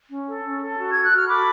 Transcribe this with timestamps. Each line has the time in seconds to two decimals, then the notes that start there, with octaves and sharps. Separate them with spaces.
0.10 C#4
0.26 A4
0.44 C#4
0.61 A4
0.78 F#4
0.91 A4 G#6
1.03 F#6
1.12 F#4 F6
1.28 A4 B5 D6